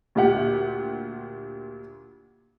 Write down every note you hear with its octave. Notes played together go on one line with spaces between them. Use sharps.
D2 A#2 G4 F#5